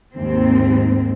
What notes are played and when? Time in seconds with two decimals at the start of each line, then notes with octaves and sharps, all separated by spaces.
0.17 D#2 G#2 C4